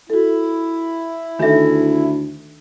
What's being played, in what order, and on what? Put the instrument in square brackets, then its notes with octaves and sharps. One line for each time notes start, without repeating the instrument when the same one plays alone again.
[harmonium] E4 [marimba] F#4 A4
[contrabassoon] D2 [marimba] D#3 D#4 A4 [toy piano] D4 E5